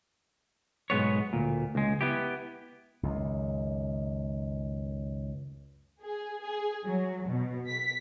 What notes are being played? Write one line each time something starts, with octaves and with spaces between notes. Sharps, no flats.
B1 G#2 G#3 B3 C#5
D2 A#2
C#2 G#3
B3 E4 G4
C#2 F#2 D#3
G#4
G#4
F#3
B2
B6